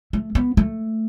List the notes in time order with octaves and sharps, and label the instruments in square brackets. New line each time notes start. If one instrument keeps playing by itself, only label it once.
[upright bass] A3
B3
A3